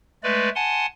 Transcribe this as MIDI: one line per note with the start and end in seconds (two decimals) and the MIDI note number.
0.23 0.49 56
0.23 0.49 57
0.23 0.49 71
0.23 0.49 74
0.55 0.86 78
0.55 0.86 80
0.55 0.86 81
0.55 0.86 84